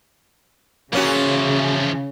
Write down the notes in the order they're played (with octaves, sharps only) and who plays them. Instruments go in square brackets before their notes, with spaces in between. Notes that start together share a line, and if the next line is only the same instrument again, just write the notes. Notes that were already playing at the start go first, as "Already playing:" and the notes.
[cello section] C#3 [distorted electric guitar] E3 F3 [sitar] A#3 C#4 F#4